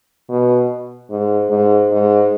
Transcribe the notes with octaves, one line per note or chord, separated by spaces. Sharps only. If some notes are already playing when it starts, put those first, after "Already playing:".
B2
G#2
G#2
G#2